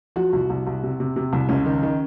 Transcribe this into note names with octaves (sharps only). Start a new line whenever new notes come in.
F3 F#4
C2
C2
C2
C3
C3
C3
C2
C#2 C#4
D#3
D#3